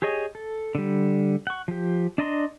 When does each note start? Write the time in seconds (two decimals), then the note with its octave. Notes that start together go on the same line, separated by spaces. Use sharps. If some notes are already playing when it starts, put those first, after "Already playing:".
0.02 G4 G#4 C#5 D#5 G#5
0.35 A4
0.75 D3 G3
1.47 F#5 C#6
1.68 F3 G4
2.18 D4 D5 D#5 A#5 C6